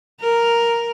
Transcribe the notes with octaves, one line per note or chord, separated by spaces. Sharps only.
A#4